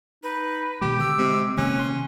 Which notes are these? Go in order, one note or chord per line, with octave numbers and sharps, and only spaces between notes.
D#4 B4
B2 D#3 G#3 G4 D6
D3 E6
C3 G#3
C3 D#3 A#3 C#4 F#6
C6